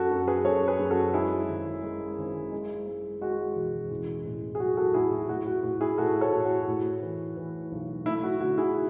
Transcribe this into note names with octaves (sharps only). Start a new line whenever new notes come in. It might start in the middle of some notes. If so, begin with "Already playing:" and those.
Already playing: F#2 F#4 A4
F#2
G#4 B4
F#2 A4 C#5
G#4 B4
F#2
F#4 A4
G#3 E4 G#4
G#1
G#3
G#1
G#3
G#3
G#3 F#4
E1
A1
A2
G#4
F#3 F#4
F#4 A4
A2 E4 G#4
F#4
A2 F#4
F#4
A2 F#4
E4 G#4
A2 F#4 A4
A4 C#5
A2
F#4
A2
E3
E3
B1
A3 E4
F#4
D3 F#4
E4 G#4